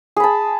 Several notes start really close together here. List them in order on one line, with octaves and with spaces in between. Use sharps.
G#4 B5 A5